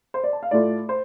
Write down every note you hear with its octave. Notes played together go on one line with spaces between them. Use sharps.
C5
D5
A5
F5
A2 A3 F4 D5
C5